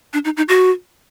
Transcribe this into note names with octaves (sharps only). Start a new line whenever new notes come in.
D4
D#4
D#4
F#4